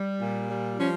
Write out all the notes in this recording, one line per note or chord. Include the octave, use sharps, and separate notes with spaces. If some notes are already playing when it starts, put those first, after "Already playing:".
Already playing: G3
A#2
G3
F3 C#4